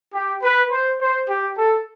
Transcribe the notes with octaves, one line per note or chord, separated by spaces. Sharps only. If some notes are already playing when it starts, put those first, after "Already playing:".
G4
B4
C5
C5
G4
A4